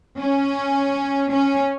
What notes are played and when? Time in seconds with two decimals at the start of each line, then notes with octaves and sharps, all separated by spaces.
0.18 C#4
1.31 C#4